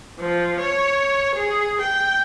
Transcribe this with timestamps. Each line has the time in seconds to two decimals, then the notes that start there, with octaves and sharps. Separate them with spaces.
0.20 F3
0.59 C#5
1.35 G#4
1.81 G5